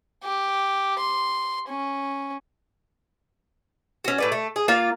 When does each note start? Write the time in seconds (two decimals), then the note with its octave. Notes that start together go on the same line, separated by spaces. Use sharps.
0.24 G4
0.99 C6
1.68 C#4
4.04 C#4 F#4
4.18 A2 B4 D5
4.32 A3
4.56 G#4
4.68 A#3 F4 D5 F5